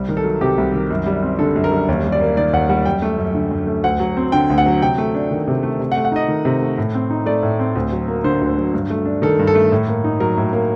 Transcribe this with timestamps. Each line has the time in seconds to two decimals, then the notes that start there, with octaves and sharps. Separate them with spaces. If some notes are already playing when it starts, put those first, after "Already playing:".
Already playing: C2 G3
0.09 D#3
0.17 A4
0.24 F#3
0.41 C3 G4
0.58 C2
0.74 D#3
0.90 F#2
1.06 G3
1.22 C4
1.39 D3 A4
1.56 F#2
1.64 A#4
1.72 G3
1.89 D#2
2.04 G3
2.12 D5
2.20 A#3
2.37 D#3 D5
2.53 D#2 F#5
2.69 G3 F#5
2.85 F#2 G5
3.02 A3
3.18 F#2
3.35 D3
3.51 F#2
3.67 A3
3.84 D2 F#5
4.00 F#3
4.17 C4
4.32 D3 G5
4.50 D2
4.58 F#5
4.66 F#3
4.81 C3 G5
4.98 A3
5.15 D4
5.31 D#3
5.48 C3
5.63 A3
5.79 C3
5.92 F#5
5.97 A3
6.05 F#5
6.12 D#4 D#5
6.28 D#3
6.45 C3
6.62 A3
6.78 A2
6.94 C4
7.10 D#4
7.26 A3 D5
7.43 A2
7.59 C4
7.75 D2
7.92 F#3
8.08 A#3
8.24 D3 C5
8.41 D2
8.58 F#3
8.74 G2
8.90 A3
9.05 D4
9.22 D#3 A4
9.39 G2
9.47 A4
9.55 A3
9.72 A2
9.88 A#3
10.04 D#4
10.20 F#3 A#4
10.37 A2
10.53 A#3